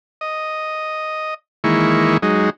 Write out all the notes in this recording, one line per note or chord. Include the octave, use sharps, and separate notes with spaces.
D#5
D#3 E3 G#3 A#3 E4 C#6
F#3 G#3 D#4